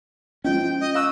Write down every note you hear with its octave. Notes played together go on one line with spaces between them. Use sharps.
F3 G#3 A#3 C#4 D#5 G5
D#5
F5 C#6 E6 F#6